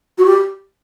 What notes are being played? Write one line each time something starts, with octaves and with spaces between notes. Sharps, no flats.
F#4
G4